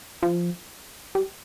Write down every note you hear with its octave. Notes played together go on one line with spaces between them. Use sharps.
F3
G3